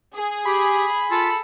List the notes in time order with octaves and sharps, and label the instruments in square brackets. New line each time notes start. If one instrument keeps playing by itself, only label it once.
[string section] G#4
[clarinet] G4 [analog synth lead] B5
[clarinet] F4 [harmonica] A4